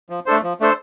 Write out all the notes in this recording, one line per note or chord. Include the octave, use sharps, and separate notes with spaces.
F3
A3 D4 A4 C5
F3
A3 D4 A4 C5